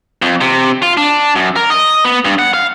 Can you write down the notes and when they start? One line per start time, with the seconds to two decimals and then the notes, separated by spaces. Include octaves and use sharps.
0.22 F2
0.41 C3
0.82 F4
0.97 D4
1.35 F#2
1.56 A#4
1.70 D#5
2.05 B3
2.25 G2
2.39 F#5
2.54 F5